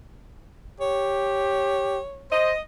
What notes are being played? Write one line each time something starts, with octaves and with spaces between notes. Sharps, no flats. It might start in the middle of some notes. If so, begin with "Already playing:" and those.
G4 C#5
C5 D#5